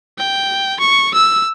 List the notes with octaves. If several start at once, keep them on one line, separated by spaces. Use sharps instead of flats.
G5
C#6
E6